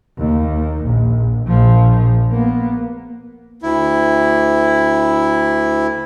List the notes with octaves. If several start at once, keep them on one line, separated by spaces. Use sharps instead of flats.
D#2
A#1
A#1 F3
A#3 B3
D2 E4